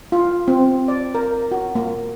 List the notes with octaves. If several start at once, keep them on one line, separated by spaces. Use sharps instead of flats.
F4
C4
D5
A#4
F#4
A#3